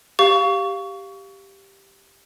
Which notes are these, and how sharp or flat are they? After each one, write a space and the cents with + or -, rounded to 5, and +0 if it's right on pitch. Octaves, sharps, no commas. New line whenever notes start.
G4 +0 F5 +0 C#6 +25